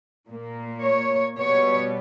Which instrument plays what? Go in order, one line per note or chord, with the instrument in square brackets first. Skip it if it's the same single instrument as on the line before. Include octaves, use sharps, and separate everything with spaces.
[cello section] A#2 A#3
C#5
B2 G3 B3 C#5